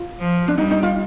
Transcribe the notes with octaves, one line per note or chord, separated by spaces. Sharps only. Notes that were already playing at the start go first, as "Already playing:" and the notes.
Already playing: F4
F3
D4
G3 D#4
D#4
F4